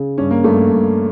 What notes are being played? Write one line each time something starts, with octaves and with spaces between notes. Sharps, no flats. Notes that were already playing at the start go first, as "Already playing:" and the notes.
Already playing: C#3
G2 C#4
A#3
G2 A3
A#3
G2